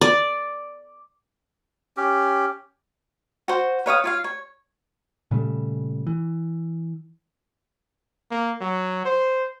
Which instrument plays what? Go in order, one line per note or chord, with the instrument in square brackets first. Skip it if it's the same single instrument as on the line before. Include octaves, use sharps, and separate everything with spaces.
[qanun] D5
[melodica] C#4 G4
[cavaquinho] F#4 C5
B4 C#5 F5 D#6
F4 C#5 F5
C#5
[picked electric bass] A#2 C#3 G3 A3
E3
[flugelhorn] A#3
F#3
C5